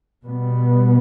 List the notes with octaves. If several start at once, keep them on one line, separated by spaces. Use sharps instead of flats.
B2 G3 B3